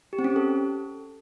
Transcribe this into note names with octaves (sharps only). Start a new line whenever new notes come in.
G4
C4
C#4
G4
A4